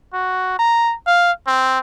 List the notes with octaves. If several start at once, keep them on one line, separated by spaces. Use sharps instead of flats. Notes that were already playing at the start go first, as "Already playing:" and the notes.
F#4
A#5
F5
C4